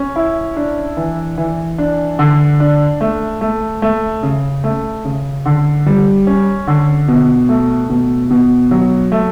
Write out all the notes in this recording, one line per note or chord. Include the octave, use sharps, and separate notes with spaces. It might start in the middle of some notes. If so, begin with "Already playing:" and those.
Already playing: C#4
E4
D4
E3
E3
D4
D3
D4
A3
A3
A3
C#3
A3
C#3
D3
G3
C#4
D3
B2
A3
B2
B2
F#3
A3